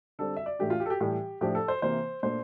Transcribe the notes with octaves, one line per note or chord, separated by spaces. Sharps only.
D3 G3 C4 A4
E5
D5
A2 E3 A3 D4 G4
F4
G4
A4
G4
A2 E3 G3 G4
A2 F3 A3 D4 G4
A4
C5
C3 E3 A#3 C5
A#2 A3 D4 C5